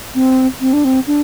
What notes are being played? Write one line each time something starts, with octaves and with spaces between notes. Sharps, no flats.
C4
C4
D4
C4
D4